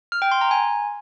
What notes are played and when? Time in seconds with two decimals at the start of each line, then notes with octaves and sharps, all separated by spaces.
0.12 F6
0.22 G5
0.31 C6
0.41 A#5
0.51 G#5